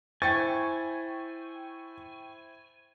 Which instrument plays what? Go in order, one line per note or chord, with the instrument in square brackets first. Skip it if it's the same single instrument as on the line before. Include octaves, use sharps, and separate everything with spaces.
[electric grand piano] E4 C5 [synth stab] G5 C#6 [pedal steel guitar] G#5 [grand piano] A6